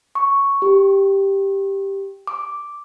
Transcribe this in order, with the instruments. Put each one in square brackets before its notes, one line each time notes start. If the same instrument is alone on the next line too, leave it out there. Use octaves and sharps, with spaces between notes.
[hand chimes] C#6
G4
D6